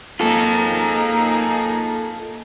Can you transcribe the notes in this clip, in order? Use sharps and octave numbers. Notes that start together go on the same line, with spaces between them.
A#3 D#4 F4 G#4 A4